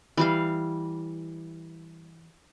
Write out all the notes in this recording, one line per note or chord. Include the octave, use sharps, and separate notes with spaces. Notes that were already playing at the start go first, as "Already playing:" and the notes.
E3 G3 F5